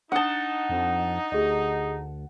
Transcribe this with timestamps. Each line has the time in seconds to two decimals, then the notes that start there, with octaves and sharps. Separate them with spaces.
0.12 D4 D#4 F#5 A5 D#6 G7
0.69 F2
1.32 D2 G4 G#4 D#5